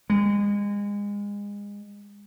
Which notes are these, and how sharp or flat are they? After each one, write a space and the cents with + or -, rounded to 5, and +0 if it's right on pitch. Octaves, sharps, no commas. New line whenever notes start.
G#3 -30